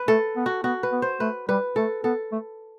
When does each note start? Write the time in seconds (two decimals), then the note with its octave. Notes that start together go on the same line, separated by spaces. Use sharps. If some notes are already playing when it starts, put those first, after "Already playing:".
Already playing: B4
0.08 A3 A4
0.36 B3
0.46 F#4
0.64 B3 F#4
0.83 B4
0.92 B3
1.02 C5
1.20 A3 B4
1.49 G3 B4
1.76 A3 A4
2.04 B3 A4
2.32 A3